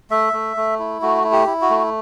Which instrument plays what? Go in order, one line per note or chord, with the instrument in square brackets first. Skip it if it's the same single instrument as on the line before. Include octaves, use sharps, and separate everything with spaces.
[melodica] A3 E5
A3
A3
E4
A3 F#4
E4
G4
E4
F#4
A3